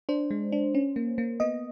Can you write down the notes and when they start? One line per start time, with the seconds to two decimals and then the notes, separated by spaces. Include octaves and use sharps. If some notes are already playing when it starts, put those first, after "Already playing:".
0.09 D4 C5
0.31 G#3
0.52 D4
0.75 C#4
0.96 A#3
1.18 A#3
1.40 B3 D#5